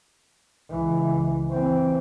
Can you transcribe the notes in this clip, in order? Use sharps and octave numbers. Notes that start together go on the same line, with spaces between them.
C#2 E3
E3 C4